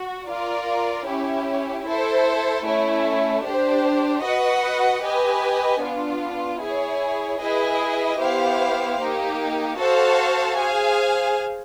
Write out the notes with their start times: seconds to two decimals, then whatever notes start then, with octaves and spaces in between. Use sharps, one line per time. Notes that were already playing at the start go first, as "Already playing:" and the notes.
Already playing: F#4
0.27 F4 A#4 D5
1.06 C#4 E4 G4
1.85 E4 A4 C5
2.65 A3 C#4 E4
3.44 D4 G4 C5
4.23 F#4 B4 D#5 F#5
5.03 G4 B4 D#5 G#5
5.82 B3 D4 F4
6.60 E4 G#4 C#5
7.40 E4 G#4 B4 D#5
8.19 B3 E4 G4 C5 F5
8.99 A#3 D#4 G4
9.79 F#4 A4 C5 F5 A5
10.57 G#4 C5 F5 G#5